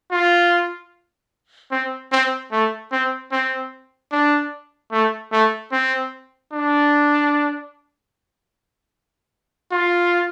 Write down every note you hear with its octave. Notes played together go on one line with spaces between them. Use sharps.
F4
C4
C4
A3
C4
C4
D4
A3
A3
C4
D4
F4